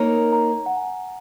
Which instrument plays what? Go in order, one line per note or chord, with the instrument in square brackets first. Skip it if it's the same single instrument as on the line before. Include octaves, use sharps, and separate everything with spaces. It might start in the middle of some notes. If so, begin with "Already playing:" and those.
Already playing: [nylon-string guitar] A#3 D#4 A#4 C#5 [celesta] A#5
[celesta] A#5
F#5
G#5